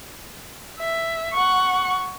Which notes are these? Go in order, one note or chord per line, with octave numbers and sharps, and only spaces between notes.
E5
F#5 C#6